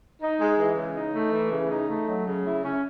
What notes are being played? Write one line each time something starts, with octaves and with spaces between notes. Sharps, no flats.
D#4
G#3
E3
C#3
D#4
A3
E3
C#3
D#4
A3
F#3
C#3
E4
C#4